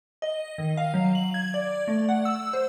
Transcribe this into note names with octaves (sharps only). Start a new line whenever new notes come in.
D#5
D#3
F5
F#3
F#7
G#6
D5
A3
F#5
E6
C5